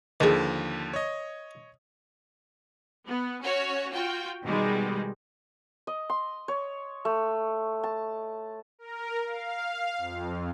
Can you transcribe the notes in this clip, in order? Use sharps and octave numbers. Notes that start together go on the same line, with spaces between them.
D#2 D3 D#3 F3 G#4
C#5 D#5
B3
C#4 F#4 C#5
F4 F#4 G5
B2 D#3 G3 G#3
D#5
C6
C#5
A3
A5
A#4
F5
F2